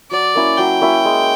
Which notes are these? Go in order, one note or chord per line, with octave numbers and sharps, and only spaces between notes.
F#3 D5
A#3 C#4 E4
F#3 G5
A#3 C#4 E4
G#3